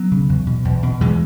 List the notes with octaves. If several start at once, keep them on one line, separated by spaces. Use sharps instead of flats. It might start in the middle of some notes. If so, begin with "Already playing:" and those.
Already playing: F#3 B3
C#3
E2
B2
E2
B2
E2 E3 G#3